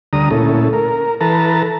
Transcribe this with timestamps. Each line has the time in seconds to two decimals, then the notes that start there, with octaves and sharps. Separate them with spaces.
0.13 D2 D3 G3 A#5 D#6
0.31 A#2 A3 C#4 E4 A4
0.73 A#4
1.21 E3 A4 B4 A5 A#5